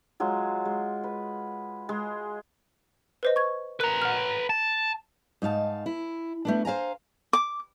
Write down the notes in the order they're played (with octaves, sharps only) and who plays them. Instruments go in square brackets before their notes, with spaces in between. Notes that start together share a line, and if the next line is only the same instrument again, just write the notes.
[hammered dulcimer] F#3 G#3 F4
G#3
B4
G#3
[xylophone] B4 C5 D#5
C#6 G#6
[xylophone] A#4 F#6 [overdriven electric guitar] B4 A#5
[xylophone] F#5 F6
[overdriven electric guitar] A5
[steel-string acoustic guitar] G#2 D#4 F5 A5
E4
A3 B3 D4
C5 F5 G#5 A#5
[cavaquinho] D6